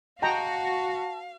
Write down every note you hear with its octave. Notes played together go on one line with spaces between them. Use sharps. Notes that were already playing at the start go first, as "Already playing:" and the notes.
F#4 D#5 F5 G5 A5 A#5